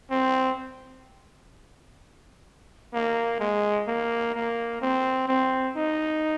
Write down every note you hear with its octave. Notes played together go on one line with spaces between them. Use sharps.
C4
A#3
G#3
A#3
A#3
C4
C4
D#4